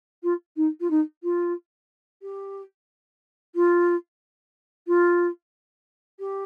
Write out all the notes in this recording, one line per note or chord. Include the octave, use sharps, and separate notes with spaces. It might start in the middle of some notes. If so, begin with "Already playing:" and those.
F4
D#4
F4
D#4
F4
G4
F4
F4
G4